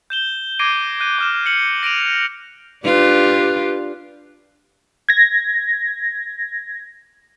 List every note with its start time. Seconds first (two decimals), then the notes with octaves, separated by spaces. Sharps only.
0.10 G6 E7 G7
0.59 D6 G#6 A#6 C7 D7 D#7
1.00 F#6 G6 D#7
1.19 D6 F6 E7
1.46 C#7 F#7
1.83 A#6 D7 D#7 F7
2.85 D4 F4 G4 B4
5.09 G#6 A#6